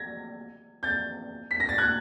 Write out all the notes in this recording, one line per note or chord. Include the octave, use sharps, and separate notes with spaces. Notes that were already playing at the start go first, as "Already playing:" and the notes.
Already playing: G#6 A#6
G6 A6
B6
A#6
A6
F#6 G#6